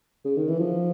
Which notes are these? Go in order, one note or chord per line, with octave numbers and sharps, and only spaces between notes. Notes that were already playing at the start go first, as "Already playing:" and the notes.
C#3
D#3
E3
F3